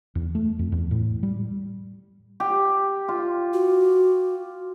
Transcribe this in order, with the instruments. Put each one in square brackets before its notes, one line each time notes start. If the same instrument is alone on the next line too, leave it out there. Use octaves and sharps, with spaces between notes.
[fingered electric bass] E2
A3
F2
E2
A2
G3
[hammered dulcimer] G4
F4
[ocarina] F#4